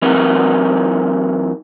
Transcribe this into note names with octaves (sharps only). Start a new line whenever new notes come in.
E3 F#3 C4 D#4 A#4 B4